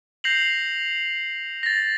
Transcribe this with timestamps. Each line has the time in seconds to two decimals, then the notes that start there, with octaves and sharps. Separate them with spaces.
0.24 G6 A#6 C7 F7 F#7
1.63 A6 A#6